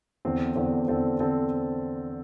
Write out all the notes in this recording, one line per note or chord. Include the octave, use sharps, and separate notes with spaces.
E2 D3 C4 A4 C5
E2 D3 C4 A4 C5
E2 D3 C4 A4 C5
D3 C4 A4 C5